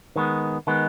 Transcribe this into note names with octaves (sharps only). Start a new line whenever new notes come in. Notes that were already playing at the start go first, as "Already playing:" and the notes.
D#3 G#3 B3
D#3 G#3 B3